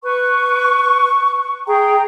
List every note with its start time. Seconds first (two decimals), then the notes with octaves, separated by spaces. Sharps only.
0.03 B4 C#6
1.67 G#4 G5 A#5